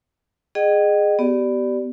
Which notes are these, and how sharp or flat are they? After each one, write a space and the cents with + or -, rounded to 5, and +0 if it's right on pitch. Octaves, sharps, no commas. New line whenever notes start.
G#4 +0 D#5 -30 G5 -35
B3 +10 G4 -25 D5 +0